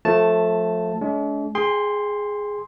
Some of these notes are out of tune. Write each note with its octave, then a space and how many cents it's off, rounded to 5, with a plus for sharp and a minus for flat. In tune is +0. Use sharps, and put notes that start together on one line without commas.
F3 +25 A3 +0 A5 +0
G#3 +40 D4 -45
G#4 +0 G5 +35 C6 +0